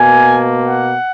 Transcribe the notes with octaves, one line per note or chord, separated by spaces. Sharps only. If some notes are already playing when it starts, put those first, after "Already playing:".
Already playing: B2 A#3 G#5
F#5